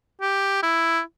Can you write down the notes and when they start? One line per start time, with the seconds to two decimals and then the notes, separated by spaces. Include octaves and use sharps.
0.21 G4
0.63 E4